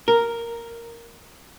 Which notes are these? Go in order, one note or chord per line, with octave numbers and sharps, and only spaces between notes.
A#4